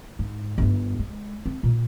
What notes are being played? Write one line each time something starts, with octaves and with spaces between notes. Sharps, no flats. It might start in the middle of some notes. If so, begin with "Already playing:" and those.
G#2
G1 G2
G#3
C4
A#2